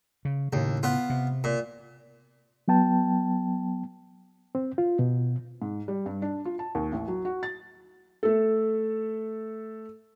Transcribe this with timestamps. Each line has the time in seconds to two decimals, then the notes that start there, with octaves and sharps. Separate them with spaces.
0.25 C#3
0.53 D#2 A2 C#3
0.83 B3 F4
1.10 C3
1.44 A#2
2.68 F#3 B3 G5 A5
4.55 C4
4.78 F4
4.99 B2
5.62 G#2
5.88 G3
6.06 G2
6.22 D4
6.45 F4
6.59 A5
6.75 D#2
6.92 A1
7.08 F#3
7.25 F#4
7.43 A6
8.23 A3 A4